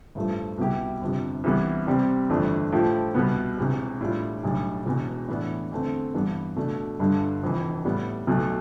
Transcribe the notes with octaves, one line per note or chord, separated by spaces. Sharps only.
A1 G2 F3 A3
C2 B2 B3 E4 G4
G1 F2 C3
C2 C3 E3 B3 E4
C2 C3 G3 C4 G4
G1 F2 E3 A3 D4
A2 F3 A3 E4 G4
C2 B2 B3
E1 E2 C3
A2 G3 D4 F4
B1 A2 G3 D4
E1 E2 B2
A2 E3 B3 D4
E2 D3 A3 C4
G2 E3 B3
B2 A3 D4
G1 G2 D3
F1 F2 E3
A2 G3 B3
B1 B2 A3